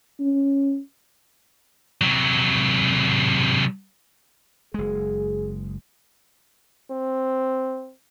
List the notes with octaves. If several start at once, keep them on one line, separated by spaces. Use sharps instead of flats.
C#4
C3 F#3
F#1 G#3 G#4
C4